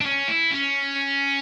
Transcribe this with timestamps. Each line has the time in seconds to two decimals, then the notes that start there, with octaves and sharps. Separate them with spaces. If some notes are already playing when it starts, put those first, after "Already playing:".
0.01 D4
0.05 C#4
0.28 E4
0.51 C#4